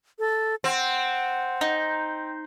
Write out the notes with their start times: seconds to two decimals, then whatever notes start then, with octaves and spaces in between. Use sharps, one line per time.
0.19 A4
0.64 C4 F#5
1.61 D#4